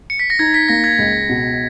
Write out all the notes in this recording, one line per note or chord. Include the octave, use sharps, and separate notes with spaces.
C#7
B6
A#6
D#4 G#6
B6
A#3 A#6
G#6
C#2
B2